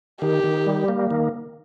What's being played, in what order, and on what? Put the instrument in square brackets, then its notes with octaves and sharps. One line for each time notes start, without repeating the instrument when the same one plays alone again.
[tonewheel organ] D#3 [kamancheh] G4
[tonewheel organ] D#3
G3
A#3
D#3